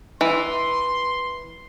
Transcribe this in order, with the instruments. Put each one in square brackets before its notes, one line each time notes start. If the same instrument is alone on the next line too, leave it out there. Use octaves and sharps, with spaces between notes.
[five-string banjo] E3 [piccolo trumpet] C6